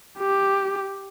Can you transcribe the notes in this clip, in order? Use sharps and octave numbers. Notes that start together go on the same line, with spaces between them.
G4